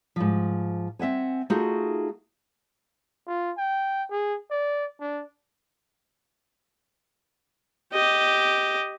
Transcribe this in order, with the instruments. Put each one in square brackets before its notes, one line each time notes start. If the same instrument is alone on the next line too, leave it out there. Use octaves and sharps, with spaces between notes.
[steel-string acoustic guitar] G#2 F3
C4 E5 F#5 G#5
A3 D#4 F4 F#4 G#4
[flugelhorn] F4
G5
G#4
D5
D4
[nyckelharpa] G4 D#5